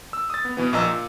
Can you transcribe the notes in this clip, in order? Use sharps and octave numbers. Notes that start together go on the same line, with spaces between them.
E6
D#6 A6
B3
B2 E3 B3
A#1 A#2 D#5 A#5 E6
A#2